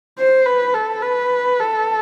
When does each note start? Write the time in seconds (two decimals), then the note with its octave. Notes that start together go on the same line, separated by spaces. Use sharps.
0.19 C5
0.46 B4
0.74 A4
1.02 B4
1.60 A4